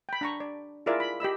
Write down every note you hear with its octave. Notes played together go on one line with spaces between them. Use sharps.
G5 B5
D4 A#5 C#6
D5
E4 F4 G#4 A#4 D5 E5
B5
G4 D#5 B5 E6